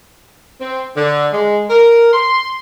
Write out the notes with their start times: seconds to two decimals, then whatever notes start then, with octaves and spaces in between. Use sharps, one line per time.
0.61 C4
0.97 D3
1.32 G#3
1.70 A#4
2.14 C6